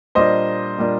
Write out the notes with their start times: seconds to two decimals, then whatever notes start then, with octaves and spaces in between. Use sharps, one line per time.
0.15 A#2 G3 A#3 D4 C5 D#5
0.78 A#2 G3 A#3 D4